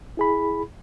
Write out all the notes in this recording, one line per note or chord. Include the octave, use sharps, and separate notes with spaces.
E4 G#4 B5